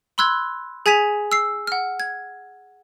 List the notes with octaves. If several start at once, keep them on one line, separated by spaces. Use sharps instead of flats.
B5 C6 E6 F#6 G#6
G#4 G#5 G#6 B6 D#7 F7
E6 C7
F#5 F6
G#6